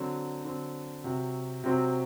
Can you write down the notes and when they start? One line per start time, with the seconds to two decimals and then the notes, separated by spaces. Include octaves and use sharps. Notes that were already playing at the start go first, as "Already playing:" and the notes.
Already playing: D3 F#3 C4
0.45 D3 F#3 C4
1.04 C3 F#3 C4 F#4
1.64 C3 F#3 C4 F#4